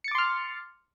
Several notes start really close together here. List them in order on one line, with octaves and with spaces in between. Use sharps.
C#7 A6 D6 C6 F6